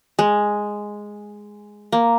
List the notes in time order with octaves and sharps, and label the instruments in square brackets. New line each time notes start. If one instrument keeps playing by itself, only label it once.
[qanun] G#3
A#3